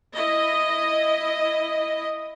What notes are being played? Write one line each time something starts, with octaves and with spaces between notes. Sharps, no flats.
E4 D#5